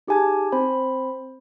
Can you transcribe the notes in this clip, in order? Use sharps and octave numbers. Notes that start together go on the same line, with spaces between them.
D#4 G4 G#4 G#5 A5 G#6
C4 C5 B5